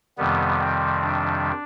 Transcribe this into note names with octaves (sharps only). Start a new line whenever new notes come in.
F2 C3 D#3 G3 B3
C4
D4